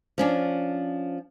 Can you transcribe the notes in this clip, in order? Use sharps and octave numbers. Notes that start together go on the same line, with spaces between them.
F3 C#4 D4